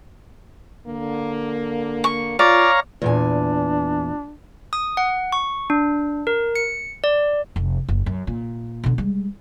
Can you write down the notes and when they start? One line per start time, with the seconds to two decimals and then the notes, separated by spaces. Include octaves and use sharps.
0.87 D3 A#3
2.04 C#6
2.39 F4 C#5 D5 F5 A#5
3.02 E2 A#2 D4 G#5
4.73 D#6
4.97 F#5
5.32 C#6
5.70 D4
6.27 A#4
6.55 C#7
7.04 D5
7.56 F1
7.89 F#1
8.06 F#2
8.27 A#2
8.84 B2 D3
8.98 G3 G#3